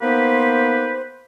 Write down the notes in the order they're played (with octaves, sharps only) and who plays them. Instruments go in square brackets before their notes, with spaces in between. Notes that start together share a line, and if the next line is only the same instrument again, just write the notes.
[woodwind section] A#3 B3 D#4 G4 B4 C5